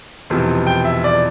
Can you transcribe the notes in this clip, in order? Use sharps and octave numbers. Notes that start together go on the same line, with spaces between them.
E1 E2 C3 F3
G5
E5
D5